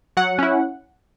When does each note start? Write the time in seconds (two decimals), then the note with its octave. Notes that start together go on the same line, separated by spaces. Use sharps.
0.17 F#3 F#5
0.38 C#4 E4